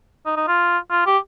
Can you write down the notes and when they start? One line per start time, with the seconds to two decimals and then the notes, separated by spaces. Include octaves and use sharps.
0.26 D#4
0.37 D#4
0.48 F4
0.91 F4
1.06 G4